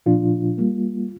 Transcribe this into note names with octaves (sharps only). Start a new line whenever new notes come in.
A#2 F3 D4 F4
G3 A#3